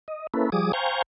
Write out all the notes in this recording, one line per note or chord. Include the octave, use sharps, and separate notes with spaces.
D#5
A#3 C#4 E4 A4 B4
F3 G3 G#4 D6 D#6
C5 F5 G5 G#5 A#5 C#6